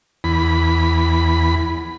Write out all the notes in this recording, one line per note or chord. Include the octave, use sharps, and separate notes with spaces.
E2 B5